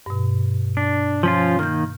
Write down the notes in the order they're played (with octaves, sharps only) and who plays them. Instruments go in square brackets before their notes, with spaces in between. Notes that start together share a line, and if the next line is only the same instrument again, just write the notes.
[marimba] G2 B2
[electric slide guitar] D4
F3 C#4 F4
[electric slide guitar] D#3 A#3 [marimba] F6 G6